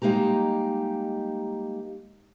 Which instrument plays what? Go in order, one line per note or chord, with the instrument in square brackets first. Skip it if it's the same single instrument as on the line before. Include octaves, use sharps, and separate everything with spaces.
[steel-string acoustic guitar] G3 G#3 A#3 D#4 G4 A#5